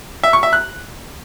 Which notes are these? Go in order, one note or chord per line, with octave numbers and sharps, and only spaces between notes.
E5
C#6
E5
F#6